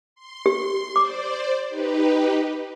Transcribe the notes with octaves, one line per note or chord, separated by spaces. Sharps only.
C6
G4
C5 D5 D6
D#4 G4 B4